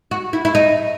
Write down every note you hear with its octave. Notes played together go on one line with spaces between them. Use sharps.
F#4
E4
E4
D#4